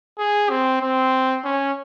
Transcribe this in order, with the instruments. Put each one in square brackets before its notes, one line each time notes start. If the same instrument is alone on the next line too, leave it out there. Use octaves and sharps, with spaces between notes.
[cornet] G#4
C4
C4
C#4